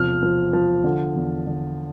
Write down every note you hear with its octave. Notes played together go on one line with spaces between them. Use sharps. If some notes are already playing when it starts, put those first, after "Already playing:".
Already playing: E1 C3 F3 F6
F3
F3
D3
E2
D3